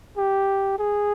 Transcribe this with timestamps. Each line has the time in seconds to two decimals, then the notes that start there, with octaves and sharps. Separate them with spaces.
0.17 G4
0.79 G#4